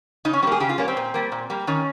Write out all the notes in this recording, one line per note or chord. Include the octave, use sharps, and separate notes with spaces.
C#3 D#4
C#4
G3 A#3 C4 G#4
C#3 G4
F4
G3 A#3 C#4
C4
A#2
G3 A#3
A#2
G3 A#3
D#3 C#4